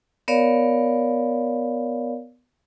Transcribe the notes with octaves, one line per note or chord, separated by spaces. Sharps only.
B3 A#4 C#5 D5 F5